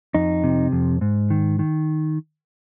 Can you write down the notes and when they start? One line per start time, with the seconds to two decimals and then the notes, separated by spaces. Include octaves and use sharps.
0.15 F2 D#4
0.44 C3
0.72 F2
1.01 G#2
1.30 D#3
1.59 D#3